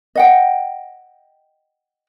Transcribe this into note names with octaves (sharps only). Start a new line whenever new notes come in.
D#5 F#5 G5